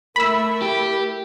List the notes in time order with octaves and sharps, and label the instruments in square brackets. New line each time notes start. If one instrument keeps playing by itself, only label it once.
[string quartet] A3 E4 E5 [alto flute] A#4 [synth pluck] B5 E6
[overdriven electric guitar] G4